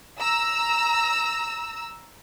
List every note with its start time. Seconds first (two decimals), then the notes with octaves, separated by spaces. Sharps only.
0.20 A#5 E6